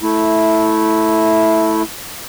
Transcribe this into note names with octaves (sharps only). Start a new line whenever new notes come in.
A3 E4